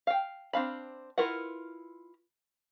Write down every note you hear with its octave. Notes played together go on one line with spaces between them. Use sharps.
F5 G5
C4 D4 F5 B5
E4 F4 A#4 B4 F#5